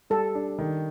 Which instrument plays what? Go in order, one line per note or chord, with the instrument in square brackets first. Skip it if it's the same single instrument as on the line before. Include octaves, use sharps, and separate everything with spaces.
[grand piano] G3 [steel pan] A4
[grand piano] D4
D#3